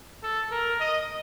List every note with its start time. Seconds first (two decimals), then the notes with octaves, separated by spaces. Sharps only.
0.23 A4
0.51 A#4
0.80 D#5